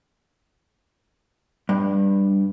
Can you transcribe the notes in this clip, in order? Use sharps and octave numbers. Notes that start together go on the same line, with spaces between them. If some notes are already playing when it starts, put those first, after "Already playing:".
G2